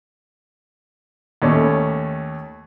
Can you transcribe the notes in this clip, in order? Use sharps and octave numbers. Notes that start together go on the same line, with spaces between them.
D#2 A3 C#4